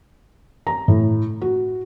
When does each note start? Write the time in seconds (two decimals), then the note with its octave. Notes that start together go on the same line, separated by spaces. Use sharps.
0.67 A#5
0.88 A2
1.41 F#4